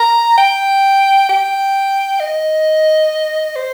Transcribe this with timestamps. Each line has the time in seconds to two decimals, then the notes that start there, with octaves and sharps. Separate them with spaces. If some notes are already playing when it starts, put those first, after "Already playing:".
Already playing: A#5
0.38 G5
1.29 G5
2.20 D#5
3.56 C5